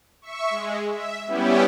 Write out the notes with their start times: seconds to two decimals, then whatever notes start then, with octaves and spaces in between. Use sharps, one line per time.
0.22 E5 C#6
0.50 G#3
0.92 E5
1.26 G3 B3 C#4 E4 G4